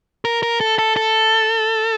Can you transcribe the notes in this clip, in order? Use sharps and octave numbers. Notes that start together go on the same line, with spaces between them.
A#4
A#4
A4
A4
A4